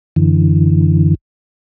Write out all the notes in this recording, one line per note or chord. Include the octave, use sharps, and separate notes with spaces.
F#2 D3 E3